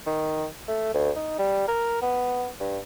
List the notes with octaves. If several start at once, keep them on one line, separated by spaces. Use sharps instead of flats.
D#3
A3
D2
D#4
G3
A#4
B3
G2